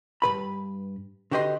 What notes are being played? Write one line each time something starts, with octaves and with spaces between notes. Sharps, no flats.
G2 C3 B4 B5
D3 F#4 G4 B4 D#5 C6